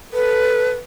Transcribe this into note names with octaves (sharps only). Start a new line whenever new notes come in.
A4 B4